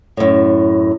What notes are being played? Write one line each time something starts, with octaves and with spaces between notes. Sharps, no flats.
F#2 A2